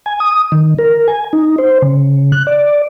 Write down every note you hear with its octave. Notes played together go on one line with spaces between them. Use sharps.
G#5
D#6
D#3
A#4
G#5
D#4
C5
C#3
F#6
D5